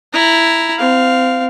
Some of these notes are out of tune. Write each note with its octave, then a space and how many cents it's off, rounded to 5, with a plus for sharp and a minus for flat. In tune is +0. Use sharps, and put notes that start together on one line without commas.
E4 +0 A#5 +0
C4 -25 F5 +0